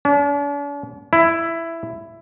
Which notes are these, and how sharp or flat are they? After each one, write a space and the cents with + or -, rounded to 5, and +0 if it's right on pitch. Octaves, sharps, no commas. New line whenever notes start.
D4 -45
E4 +10